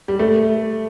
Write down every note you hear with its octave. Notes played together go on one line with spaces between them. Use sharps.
G3
A3